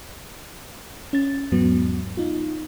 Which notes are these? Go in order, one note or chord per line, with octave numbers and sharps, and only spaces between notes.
C#4 A6
E2 G#2 F#3 B3
D#4 F4